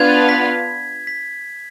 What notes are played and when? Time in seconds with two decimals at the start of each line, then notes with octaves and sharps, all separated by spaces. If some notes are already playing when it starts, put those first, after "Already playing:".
Already playing: B3 D4 F4 B4 F5 G#6
0.29 B6
1.07 B6